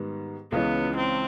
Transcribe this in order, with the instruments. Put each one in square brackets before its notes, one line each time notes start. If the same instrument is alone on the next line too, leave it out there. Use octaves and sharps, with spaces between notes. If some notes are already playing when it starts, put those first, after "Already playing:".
Already playing: [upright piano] G#2 D#3 G3 B3
[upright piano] C#2 C#3 E3 G#3 C#4 [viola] B3
[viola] C4